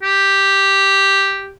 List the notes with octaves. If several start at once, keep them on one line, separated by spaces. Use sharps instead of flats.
G4